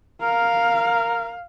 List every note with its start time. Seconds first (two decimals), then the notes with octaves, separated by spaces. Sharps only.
0.22 A#4 F5